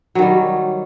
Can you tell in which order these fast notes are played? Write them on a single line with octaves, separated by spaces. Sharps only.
F#3 D#3 G3